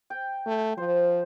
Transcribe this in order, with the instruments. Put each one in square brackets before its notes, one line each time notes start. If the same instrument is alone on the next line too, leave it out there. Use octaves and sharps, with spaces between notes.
[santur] G5
[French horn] A3
[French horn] F3 [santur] C5